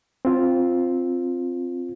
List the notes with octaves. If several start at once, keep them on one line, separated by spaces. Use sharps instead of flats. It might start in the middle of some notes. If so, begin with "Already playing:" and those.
C4 F4